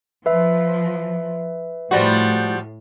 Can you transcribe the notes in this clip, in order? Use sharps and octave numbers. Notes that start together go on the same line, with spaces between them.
F3 B4 E5
A2 F3 G3 F#4